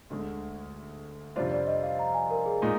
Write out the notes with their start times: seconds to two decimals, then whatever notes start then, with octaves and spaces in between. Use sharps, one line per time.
0.10 D2 D3 G#3
1.36 F2 C3 G3 D4 F4 C5
1.51 D5
1.67 D#5
1.83 F5
1.99 A#5
2.14 G#5
2.30 A#4
2.46 G#4
2.62 A#2 G#3 D#4